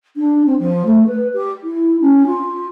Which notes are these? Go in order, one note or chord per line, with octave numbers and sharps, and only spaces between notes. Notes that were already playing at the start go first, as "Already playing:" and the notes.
D4
C4
F3
A3
B4
G4
E4
C#4
F4